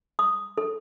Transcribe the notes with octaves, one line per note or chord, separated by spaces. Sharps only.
D#6
A4